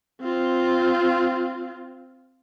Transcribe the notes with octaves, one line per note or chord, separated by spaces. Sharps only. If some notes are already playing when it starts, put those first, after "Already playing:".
C4 F4